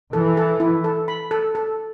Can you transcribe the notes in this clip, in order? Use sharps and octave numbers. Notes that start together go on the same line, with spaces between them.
E3 A4
A4
E4
A4
B5
A4
A4